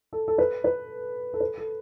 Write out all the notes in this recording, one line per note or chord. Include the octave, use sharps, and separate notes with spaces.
A4
A4
B4
B4
A4
B4
A4